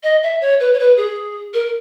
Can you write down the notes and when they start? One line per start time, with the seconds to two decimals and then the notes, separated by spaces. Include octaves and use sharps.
0.03 D#5
0.22 E5
0.41 C#5
0.59 B4
0.73 C#5
0.79 B4
0.96 G#4
1.53 A#4